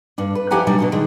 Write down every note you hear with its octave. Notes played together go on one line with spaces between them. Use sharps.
G2 D4
B4
F3 E4 G4 F#5 G#5 A#5
B2 F#3 G3 D4
B2 D4 F#4
D#3 G#3